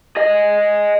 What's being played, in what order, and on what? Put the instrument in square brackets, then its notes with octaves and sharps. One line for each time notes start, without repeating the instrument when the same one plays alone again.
[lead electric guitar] G#4 D#5